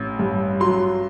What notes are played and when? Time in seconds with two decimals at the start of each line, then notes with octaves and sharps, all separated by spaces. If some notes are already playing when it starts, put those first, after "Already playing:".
Already playing: A1
0.19 G2
0.60 F#3 C6